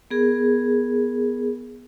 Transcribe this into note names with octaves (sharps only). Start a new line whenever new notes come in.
B3 G#4 A#4